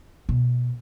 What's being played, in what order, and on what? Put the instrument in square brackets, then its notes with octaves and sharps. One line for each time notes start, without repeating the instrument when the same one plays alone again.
[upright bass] B2